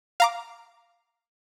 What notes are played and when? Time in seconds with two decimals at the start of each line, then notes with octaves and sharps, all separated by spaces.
0.20 F5 A#5 D6